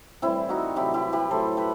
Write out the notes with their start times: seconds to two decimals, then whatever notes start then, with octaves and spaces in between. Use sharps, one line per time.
0.22 A2 E3 G3 C4 E4
0.49 D#4 F#4
0.76 C3 F#3 A3 E4 G4
0.94 E4 G4
1.13 G4 B4
1.30 A2 F#3 A3 A4 C5
1.57 G4 B4